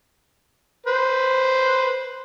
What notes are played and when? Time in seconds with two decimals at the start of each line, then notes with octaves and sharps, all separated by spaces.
0.86 B4 C5